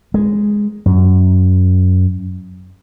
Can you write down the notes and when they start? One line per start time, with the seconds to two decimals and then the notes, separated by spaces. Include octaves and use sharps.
0.14 G#3
0.86 F#2